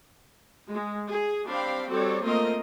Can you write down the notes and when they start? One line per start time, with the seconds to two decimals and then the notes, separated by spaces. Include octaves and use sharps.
0.69 G#3
1.11 G#4
1.46 G3 C4 D4 F5 G5 B5
1.90 G3 C4 F#4 A4 C#5 D5
2.23 A3 A#3 C4 F4 A#4 D#5